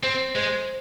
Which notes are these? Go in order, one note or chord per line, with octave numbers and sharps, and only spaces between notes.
C4 C5
G#3 C5